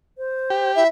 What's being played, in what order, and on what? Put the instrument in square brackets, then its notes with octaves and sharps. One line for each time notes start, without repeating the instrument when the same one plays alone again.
[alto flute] C5
[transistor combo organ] G4
[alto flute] E4 [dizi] E5